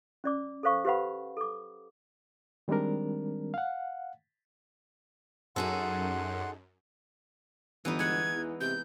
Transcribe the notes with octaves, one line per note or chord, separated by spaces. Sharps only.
C#4 D5 D6
A4 A#4 C5 F5 C#6
G4 B4 C5 F5 F#5 B5
A4 D6
D#3 G3 G#3 C4 D4 A#4
F5 F#5
F#2 D#4 G#4 A4 F#5 C6
G1 E3 B3 D#4
G#3 F#5 G#6
E2
C3 G6